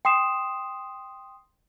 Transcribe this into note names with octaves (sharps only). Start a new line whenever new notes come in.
G5 C6 D#6 C7 E7